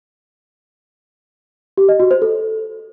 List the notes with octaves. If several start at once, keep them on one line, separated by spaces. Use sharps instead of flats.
G4
D#5
F#4
C5
A4